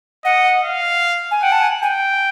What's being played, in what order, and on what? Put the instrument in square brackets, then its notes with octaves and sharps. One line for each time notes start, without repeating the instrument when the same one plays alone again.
[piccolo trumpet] D#5 [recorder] F#5
[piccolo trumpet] F5
[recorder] G#5
[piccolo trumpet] F#5 [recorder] G5
[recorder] A5
G#5
[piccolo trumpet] G5 [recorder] G#5